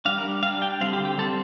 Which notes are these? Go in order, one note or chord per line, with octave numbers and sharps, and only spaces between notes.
G3 D4 F5
A#4
G3 D4 F5
G5
D3 G3 C4 F5
G4
G4
D3 G3 C4 A4